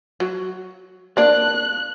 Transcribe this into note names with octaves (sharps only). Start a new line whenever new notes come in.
F#3
A#3 D4 F#6